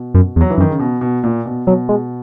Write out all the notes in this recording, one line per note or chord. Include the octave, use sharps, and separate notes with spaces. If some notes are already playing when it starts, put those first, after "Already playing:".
Already playing: B2
F#2
E2
F#3
E3
F#2
D#3
C#3
B2
B2
A#2
B2
B2 F#3
G#3